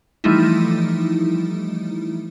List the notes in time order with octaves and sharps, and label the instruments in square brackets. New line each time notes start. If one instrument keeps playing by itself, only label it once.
[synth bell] E3 F3 G3 A3 D#4 E4